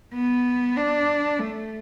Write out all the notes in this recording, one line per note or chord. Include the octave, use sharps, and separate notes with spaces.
B3
D4
A3